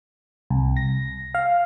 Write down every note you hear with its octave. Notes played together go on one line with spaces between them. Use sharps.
C2
A#6
F5